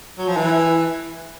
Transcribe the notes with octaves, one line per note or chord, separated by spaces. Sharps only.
F#3
F3
E3